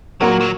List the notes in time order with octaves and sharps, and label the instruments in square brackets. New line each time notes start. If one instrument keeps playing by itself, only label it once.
[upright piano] A#2 A#3 F#4 A#4 [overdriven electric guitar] F#3
[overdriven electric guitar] F#3